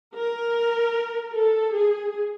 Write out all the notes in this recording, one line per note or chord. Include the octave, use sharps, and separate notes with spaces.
A#4
A4
G#4